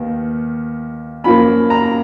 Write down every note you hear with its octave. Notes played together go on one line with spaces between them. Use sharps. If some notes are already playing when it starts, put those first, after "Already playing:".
Already playing: D#2 D#3 B3
F#2 F3 A#3 B5
A#5